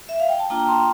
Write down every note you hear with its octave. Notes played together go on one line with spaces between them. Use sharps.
E5
F5
G5
A5
A#3 D4 F4 G5 A#5
A5 C6